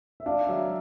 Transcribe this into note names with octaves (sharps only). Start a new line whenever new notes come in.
E5
D4 F5
F#3 E5